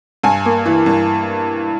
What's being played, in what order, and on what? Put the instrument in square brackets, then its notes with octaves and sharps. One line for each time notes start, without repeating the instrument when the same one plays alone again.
[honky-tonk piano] G2 G#5
A#3
E3
G2